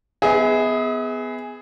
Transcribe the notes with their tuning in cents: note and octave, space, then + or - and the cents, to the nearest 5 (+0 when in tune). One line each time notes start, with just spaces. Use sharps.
B3 +15 G#4 +0 E5 -45